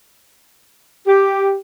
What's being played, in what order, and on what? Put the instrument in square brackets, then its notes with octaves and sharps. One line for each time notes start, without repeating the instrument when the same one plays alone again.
[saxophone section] G4